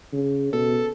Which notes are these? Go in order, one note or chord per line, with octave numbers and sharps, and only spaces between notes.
C#3
B2 A4